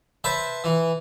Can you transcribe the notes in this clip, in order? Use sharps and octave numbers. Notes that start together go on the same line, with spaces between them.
B4 C5 E5 A5
E3